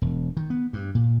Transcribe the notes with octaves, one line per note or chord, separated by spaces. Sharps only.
E1
D#3
B3
G2
A#2